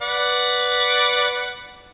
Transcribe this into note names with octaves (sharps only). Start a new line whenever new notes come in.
B4 D5 F#5